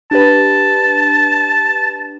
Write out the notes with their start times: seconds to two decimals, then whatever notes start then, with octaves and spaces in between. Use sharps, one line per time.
0.11 D4 G4 B4 A5